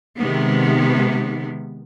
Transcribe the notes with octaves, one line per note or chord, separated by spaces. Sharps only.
C3 D#3 G#3 B3